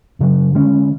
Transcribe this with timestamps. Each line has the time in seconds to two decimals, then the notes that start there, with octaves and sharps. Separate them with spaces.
0.19 F#2 C#3 F#3
0.55 D3 G#3 C#4